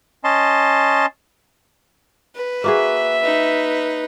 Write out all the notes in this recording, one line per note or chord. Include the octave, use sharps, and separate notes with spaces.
C#4 D#5 A5 C6
B4
A#3 F#4 G#4 E5
D#4 B4